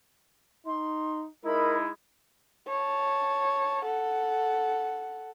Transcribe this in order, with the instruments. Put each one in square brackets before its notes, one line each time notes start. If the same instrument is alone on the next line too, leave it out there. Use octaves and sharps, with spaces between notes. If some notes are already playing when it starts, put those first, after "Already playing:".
[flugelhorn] D#4 [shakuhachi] C6
[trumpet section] G#3 D#4 E4 [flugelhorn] A#4 [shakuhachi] B5
[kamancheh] C#5 A5
A4 F#5